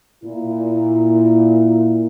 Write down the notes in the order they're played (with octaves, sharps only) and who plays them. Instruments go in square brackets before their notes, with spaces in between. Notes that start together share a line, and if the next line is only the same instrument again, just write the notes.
[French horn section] A#2 E4